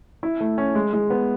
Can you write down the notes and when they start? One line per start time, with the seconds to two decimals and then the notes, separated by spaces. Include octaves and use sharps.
0.23 E4
0.40 A3
0.58 C#4
0.75 G#3
0.93 G#3
1.10 B3